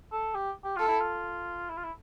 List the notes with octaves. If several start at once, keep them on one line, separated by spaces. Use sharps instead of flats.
A4
G4
G4
F4 A4
E4
F4
E4
F4
E4